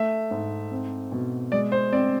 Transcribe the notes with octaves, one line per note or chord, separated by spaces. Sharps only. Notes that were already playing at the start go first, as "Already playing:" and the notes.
Already playing: A3 E5
G#2
C4
B2
G#3 D5
C5
C4 D5